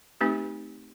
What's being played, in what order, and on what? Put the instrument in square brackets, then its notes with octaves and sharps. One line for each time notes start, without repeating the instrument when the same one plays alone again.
[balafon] A3 C4 D#4 G4 B4